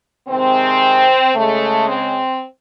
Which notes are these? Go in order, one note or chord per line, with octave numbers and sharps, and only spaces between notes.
C3 D#3 G#3 C4
C#3 G#3 A3
C4